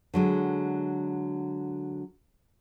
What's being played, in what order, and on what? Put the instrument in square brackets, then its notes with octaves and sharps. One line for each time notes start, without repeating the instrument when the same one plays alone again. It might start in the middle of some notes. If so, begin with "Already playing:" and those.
[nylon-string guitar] D3 F#3 G#3